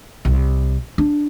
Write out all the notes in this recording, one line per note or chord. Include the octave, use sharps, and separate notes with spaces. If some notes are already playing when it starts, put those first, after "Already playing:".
C2
D4